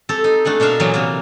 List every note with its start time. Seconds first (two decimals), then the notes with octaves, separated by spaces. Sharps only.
0.09 C4 G4 A4
0.24 D#4
0.45 A3 D4 F#5 G#5
0.60 B2 D4 A#4 E5 F5
0.80 A#2 E3 F#3 A#3 B3
0.94 C3 E3 A#3